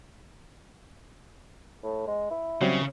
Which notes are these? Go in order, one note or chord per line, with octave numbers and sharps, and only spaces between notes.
A2
G#3
E4
C#3 F#3 G3 C4